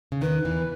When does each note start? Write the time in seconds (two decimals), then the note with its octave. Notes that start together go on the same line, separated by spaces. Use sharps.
0.12 C#3
0.21 D#2 D#3 B4
0.45 E2 E3